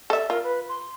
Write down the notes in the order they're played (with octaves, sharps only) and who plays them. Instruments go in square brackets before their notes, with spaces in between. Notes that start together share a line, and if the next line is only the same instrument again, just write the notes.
[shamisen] A4 E5 [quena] D5
[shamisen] F4 [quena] A#4
[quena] B4
C6